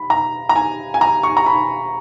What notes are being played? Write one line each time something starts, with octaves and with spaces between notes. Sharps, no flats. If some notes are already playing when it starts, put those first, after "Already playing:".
Already playing: B5
A#5
A#5
G#5
G#5
A#5
C#6
A#5
B5